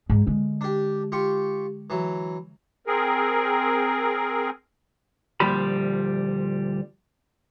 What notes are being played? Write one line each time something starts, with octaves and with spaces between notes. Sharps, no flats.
G#2
D3 G#3
D4 G4
F4 G4 C#6
E3 F#3
C4 G#4 A#4
D2 A#2 F3 G3 B5